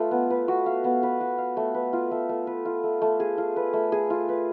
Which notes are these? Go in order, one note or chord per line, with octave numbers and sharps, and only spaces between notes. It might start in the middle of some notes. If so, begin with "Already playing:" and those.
Already playing: A3 F4 B4
B3
B4
F#4
F5
B3
B4
F#4
F5
A3
B4
F4
A3
A3
B4
F4
A3
A3
G#4
F4
B4
A3
G#4
F4
B4